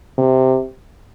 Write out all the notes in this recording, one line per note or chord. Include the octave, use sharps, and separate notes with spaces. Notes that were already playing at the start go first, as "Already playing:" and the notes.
C3